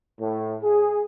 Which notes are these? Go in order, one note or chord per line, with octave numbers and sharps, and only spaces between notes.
A2
G#4